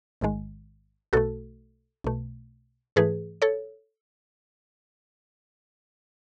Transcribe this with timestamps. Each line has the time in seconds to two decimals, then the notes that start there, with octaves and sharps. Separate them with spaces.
0.21 A1 G#2 D#3 G#3
1.13 B1 B2 A3 F#4 A4
2.04 B1 B2 A3
2.96 G#2 E3 A3 G#4 B4
3.42 A4 C#5